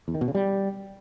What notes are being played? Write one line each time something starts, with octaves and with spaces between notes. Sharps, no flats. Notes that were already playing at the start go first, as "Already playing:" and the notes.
E2
D#3
B2
C#3
G3